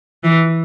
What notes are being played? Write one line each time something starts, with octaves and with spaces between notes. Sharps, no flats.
E3